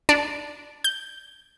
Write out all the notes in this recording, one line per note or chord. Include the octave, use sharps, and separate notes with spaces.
D4
G6